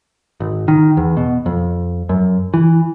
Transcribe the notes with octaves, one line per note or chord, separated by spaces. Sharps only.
G#1
D#3
E2
B2
F2
F#2
E3